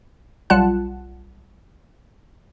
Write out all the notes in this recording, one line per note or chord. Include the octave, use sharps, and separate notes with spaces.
B1 G3 F4 F#5 A5 F#6